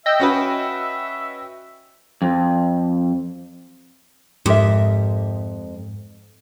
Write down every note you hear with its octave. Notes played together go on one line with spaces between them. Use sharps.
D#5 E5 G5 E6
C#4 F#4 B4
F2
F2 G#2 G4 A#4 E5